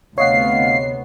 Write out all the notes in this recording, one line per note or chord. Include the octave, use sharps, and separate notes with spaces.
D2 C3 B3 C#5 D#5 F5 F#5 C7